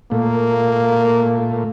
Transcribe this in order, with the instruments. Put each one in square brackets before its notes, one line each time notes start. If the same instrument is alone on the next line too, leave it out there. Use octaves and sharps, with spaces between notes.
[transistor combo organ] A#2 A3 [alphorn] A#3